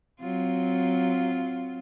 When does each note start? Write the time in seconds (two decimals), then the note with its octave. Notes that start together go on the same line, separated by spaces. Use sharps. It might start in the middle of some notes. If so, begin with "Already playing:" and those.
0.20 F#3 C4 F4